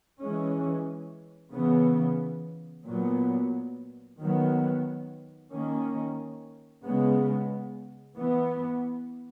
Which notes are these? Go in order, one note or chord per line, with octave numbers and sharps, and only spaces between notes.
E3 G#3 C#4
C#3 E3 B3
A#2 F#3 B3
D#3 F#3 B3
D#3 A#3 C#4
C#3 G#3 B3
E3 B3